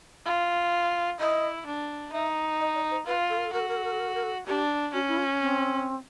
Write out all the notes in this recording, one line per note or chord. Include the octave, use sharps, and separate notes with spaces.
F4
E4 D#5
D4
D#4 E5
D#5
D5
C5
F4 B4
A4
A#4
A4
F#4 A#4
A4
A#4
A4
A#4
A4
A#4
A4
A#4
A4
D4 G4
C#4 F#4
E4
F4
C4